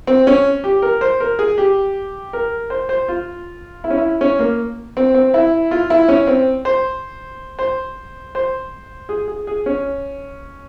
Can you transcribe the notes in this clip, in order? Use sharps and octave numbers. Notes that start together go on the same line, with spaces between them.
C4
C#4
G4
A#4
C5
A#4
G#4
G4
A#4
C5
C5
F4
E4
C#4
E4
C#4
A#3
C4
C4
E4
F4
E4
C#4
C4
C5
C5
C5
G#4
G#4
G#4
C#4